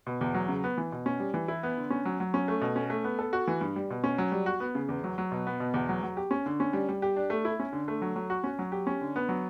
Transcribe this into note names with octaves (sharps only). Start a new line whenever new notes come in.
B2
E2
F#3
C#3
B3
E3
B2
C#4
G3
E3
E4
B3
D3
C#4
F#3
F#3
C#4
A3
B2
C#4
A3
B3
A4
F#4
E3
G2
G3
B2
C#4
F#3
G3
F#4
B3
C#3
E2
F#3
F#3
B2
B3
B2
E2
F#3
F#3
G4
C#4
D3
C#4
G3
G3
G4
D4
A3
E4
C#4
D3
A3
F#3
F#3
F#4
C#4
F#3
G4
C#4
D3
B3
F#3